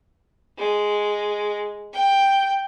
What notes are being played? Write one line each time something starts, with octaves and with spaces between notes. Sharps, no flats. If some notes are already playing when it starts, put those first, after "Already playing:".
G#3
G5